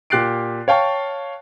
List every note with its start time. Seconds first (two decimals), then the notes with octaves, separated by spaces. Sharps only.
0.10 A#2 G4 F#6 A6 C7 D7
0.68 C#5 F5 G5 A5 C#6